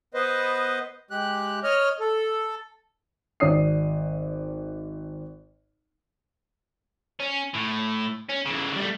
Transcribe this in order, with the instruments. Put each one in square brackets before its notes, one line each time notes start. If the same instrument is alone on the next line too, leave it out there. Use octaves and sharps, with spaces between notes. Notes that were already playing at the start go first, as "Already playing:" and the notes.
[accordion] B3 B4 C5 D#5
G#3 G4 F#6
C#5 D#5 F6
A4
[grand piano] G#1 D5 D#6 C7
[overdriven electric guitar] C#4
A2
C#4
C#3 E3
G3 A3